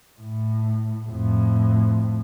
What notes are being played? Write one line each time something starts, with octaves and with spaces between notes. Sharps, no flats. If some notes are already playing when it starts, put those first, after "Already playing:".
A2
F2 A2